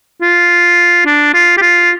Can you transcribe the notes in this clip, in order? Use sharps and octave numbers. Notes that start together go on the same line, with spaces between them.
F4
D4
F4
G4
F4